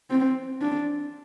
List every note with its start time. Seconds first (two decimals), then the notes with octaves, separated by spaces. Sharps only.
0.10 C4
0.61 D4